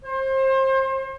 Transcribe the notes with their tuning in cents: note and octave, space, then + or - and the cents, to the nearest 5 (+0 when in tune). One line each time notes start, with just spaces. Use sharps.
C5 +30